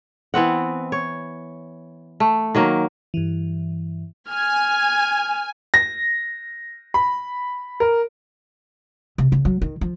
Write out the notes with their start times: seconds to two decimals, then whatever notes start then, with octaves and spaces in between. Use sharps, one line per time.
0.34 E3 B3 C4 F#5
0.92 C#5
2.20 A3
2.55 D#3 F#3 A#3
3.14 G2 E3
4.30 G#5 F6
5.74 A#6
6.94 B5
7.80 A#4
9.18 C3
9.32 C#3
9.45 F#3
9.62 D#3
9.81 F3